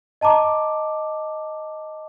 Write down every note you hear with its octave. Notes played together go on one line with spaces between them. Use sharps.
D#5 A5 A#5 D6